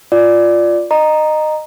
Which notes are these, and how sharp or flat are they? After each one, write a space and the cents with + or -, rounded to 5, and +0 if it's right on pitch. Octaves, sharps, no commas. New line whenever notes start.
F4 +0 D5 +0
D#5 -20 A#5 +0